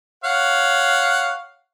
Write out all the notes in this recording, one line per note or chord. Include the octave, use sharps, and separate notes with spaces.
C#5 F5 F#5